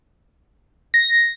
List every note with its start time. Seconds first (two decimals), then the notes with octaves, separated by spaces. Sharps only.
0.94 A#6